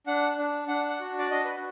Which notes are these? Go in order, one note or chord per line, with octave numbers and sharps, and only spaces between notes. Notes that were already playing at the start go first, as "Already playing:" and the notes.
D4 F#5
D4
D4 F#5
F#5
F#4
D5
D4 D#5
B4